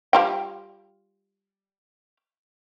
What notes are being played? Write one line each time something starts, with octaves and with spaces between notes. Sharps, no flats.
G3 F4 G5